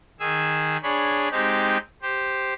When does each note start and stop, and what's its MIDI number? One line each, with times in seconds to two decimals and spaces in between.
0.20 0.77 51
0.20 0.77 68
0.20 0.77 80
0.20 0.77 88
0.83 1.29 62
0.83 1.29 68
0.83 1.29 73
0.83 1.29 83
1.31 1.78 56
1.31 1.78 60
1.31 1.78 63
1.31 1.78 67
2.02 2.54 67
2.02 2.54 72